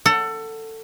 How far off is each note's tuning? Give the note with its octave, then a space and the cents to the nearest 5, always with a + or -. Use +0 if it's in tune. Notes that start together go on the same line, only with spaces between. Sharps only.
A4 +20 F#5 +0